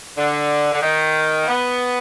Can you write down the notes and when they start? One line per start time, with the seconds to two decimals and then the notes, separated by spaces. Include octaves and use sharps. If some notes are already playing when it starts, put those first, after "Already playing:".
0.17 D3
0.73 D3
0.82 D#3
1.43 A#3
1.48 B3